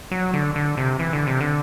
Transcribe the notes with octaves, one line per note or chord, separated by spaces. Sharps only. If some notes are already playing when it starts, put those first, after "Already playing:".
F#3
D3
D3
C3
E3
D3
C3
D3